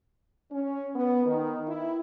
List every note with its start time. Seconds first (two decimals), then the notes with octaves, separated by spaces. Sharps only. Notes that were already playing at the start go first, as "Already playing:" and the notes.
0.51 C#4
0.95 B3
1.26 D#3
1.68 E4